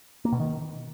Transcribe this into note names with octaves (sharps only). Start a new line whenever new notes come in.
A#3
B2
D#3